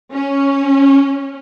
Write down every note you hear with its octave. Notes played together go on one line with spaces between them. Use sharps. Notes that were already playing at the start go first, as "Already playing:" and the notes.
C#4